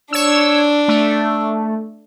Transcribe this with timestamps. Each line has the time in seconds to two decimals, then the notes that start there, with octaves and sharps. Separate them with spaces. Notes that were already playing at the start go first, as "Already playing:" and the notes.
0.13 D4 C#5 E6
0.88 A3